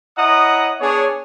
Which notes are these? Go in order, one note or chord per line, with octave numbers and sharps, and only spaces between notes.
E4 C#5 D#5 F#5 A#5 D#6
B3 D4 G#4 C#5